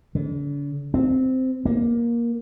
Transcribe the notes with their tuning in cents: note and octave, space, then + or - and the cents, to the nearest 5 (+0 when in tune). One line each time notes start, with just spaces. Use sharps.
D3 -45
C4 -10
A#3 +15